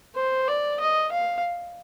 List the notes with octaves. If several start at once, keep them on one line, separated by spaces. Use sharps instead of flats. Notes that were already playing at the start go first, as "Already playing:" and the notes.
C5
D5
D#5
F5